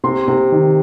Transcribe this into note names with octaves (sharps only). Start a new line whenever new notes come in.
C3 C6
C3
D#3